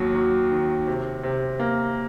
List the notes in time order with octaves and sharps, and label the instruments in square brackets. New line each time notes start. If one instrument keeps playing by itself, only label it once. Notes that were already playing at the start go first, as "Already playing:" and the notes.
Already playing: [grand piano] D#2 F#3
F#3
D#3
C3
C3
A#3